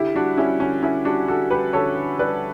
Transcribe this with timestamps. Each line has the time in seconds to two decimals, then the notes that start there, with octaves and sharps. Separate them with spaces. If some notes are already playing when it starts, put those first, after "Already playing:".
Already playing: D3 E4 G4
0.15 G3 D4 F#4
0.37 G3 C#4 E4
0.60 D3 C#4
0.83 D3 C#4 E4
1.05 G3 D4 F#4
1.28 D3 F#4 A4
1.50 G3 G4 B4
1.73 D3 A4 C#5
1.96 D3
2.18 G3 B4 D5